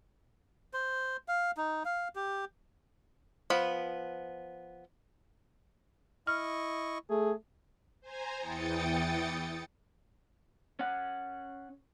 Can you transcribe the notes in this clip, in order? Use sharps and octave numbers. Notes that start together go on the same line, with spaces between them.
C5
F5
D#4
F5
G4
F3 B3 B5
E4 D#5 C#6 F6
A3 G#4
C5 G#5 A#5
E2 E3 G5 D#6 A6 C#7
C#4 F#5